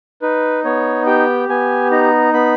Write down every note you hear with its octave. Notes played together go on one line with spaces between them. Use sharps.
D#4 B4
B3 C#5
G4 G5
B3 G#5
D#4 A#5
B3 B5